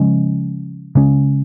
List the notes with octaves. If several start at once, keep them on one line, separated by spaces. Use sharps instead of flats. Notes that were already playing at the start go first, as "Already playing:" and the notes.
Already playing: C#3 F3 G#3 C#4
C#3 G#3 C#4